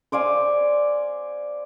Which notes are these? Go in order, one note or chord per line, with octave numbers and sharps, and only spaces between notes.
C5 D5 F5 G#5